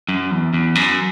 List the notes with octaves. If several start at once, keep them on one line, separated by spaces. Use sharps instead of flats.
F#2
E2
E2
F#2